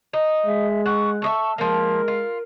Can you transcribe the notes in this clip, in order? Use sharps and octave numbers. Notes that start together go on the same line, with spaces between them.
D#4
G#3 E5
F#5 C#6
A4 D#5 E5 C#6
F3 G#3 A#3 A#4
F4